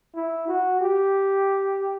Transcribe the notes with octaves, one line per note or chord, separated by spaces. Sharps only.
E4
F#4
G4